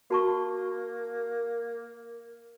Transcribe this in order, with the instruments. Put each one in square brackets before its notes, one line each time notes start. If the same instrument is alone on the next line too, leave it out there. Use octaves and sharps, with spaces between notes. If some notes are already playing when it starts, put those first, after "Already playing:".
[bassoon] A#3 [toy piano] F#4 A5 C#6